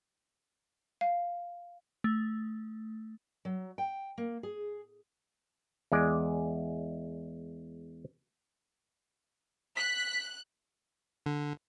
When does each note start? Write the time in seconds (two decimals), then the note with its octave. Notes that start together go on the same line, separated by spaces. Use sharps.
1.01 F5
2.04 A3
3.45 F#3
3.78 G5
4.18 A#3
4.43 G#4
5.92 E2 G#3 D5
9.77 F#6 B6
11.26 D3